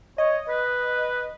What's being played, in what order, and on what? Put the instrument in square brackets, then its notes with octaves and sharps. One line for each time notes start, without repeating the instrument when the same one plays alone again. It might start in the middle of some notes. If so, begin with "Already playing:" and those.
[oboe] C#5 [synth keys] D#5
[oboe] B4